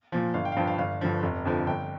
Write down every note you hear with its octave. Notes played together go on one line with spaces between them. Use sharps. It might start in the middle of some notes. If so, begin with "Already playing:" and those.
A#2 F3
G1 F5
G5
F5
G2 F3 G5
F5
G1 F5
G2 D3 F3
F1
F2 D3 F3
G1 G5